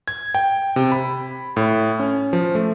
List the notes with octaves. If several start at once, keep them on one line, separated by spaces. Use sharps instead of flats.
G#6
G5
C3
B5
A2
C#4
F3
A3